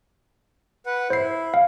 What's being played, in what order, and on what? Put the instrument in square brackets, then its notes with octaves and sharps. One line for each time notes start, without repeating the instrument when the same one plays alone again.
[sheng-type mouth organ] B4 F#5
[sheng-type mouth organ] E4 [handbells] C5 C7
[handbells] F5